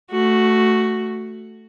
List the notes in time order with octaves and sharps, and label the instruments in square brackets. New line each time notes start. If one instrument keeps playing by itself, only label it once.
[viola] A3 F#4